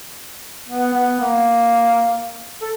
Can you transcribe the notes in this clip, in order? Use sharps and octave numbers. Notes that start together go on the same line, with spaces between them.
B3
B3
A#3
A4